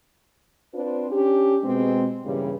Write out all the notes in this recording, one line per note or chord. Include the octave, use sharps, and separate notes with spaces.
C4 D4 F4 B4 C5
C#4 D4 G4
B2 G#3 C4
G2 A#2 C#3 E3 G3 G4